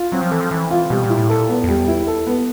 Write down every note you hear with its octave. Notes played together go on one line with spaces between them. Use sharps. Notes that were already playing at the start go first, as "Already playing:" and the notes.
Already playing: F4
F#3 C4
F3
E3 A4
F3
E3 C4
F4
B2 G3
A#2
E4
A2
A#2 A4
B3
F2
E2 G3
E4
A4
B3